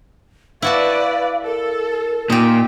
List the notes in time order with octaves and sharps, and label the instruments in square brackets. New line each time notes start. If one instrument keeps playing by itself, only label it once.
[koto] E4 F#4 A5 [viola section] B4 D5 [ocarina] F5
[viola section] A4 [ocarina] A#4
[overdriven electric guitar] A#2 [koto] D#4 G4